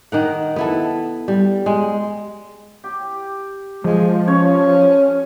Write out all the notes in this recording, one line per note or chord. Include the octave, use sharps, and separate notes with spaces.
D#3 A#4 F#5
B3 E4 A4
G3
G#3
G4
F3 G#3
C#4 C#5